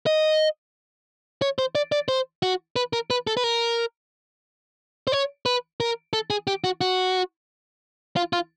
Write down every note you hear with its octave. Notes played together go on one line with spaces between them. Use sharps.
D#5
C#5
C5
D5
D5
C5
F#4
B4
A#4
B4
A4
B4
A#4
C5
C#5
B4
A#4
A4
G#4
G4
F#4
F#4
F4
F4